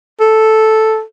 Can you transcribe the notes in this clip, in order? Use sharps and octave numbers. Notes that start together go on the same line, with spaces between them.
A4